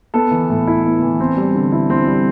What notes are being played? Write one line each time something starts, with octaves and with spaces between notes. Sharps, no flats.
B3 A4
E3
A2
E4
B3
E3
C4
G3
D3
E4
C4
G3